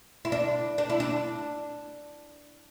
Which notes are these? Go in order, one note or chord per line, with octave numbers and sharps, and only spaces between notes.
E4
D4
D4
E4
D4